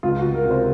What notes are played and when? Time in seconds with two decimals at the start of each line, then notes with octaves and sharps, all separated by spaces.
0.03 C#2 F4
0.19 F#4
0.25 C#2
0.35 A#4
0.46 C3 C5